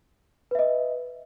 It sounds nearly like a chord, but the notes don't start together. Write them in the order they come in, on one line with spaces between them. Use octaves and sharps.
B4 E5 D#5